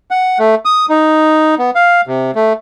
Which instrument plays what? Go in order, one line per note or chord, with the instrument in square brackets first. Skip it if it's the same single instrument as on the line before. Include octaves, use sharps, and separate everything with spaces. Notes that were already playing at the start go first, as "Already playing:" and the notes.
[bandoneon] F#5
A3
D#6
D#4
B3
F5
C3
A3